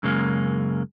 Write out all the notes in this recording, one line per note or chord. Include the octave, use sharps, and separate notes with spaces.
F#2 C#3 G#3 A#3